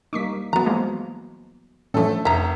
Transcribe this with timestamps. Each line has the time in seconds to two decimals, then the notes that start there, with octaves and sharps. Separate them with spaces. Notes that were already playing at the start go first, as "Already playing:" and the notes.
0.13 G3 A#3 D#4 C#6 D6 B6
0.53 E3 F#3 B3 F#4 A#5
0.66 F3 G#3 A#3
1.94 A2 E3 F3 A3 C#4 D4 A4
2.25 F1 E5 A#5